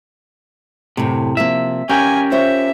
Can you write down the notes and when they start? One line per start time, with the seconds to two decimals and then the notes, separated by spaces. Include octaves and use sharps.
0.97 F#2 A2 C3
1.37 C3 F3 A#3 E5
1.89 C#4 G4 A#4 F5 G#5
2.32 F4 C5 C#5 E5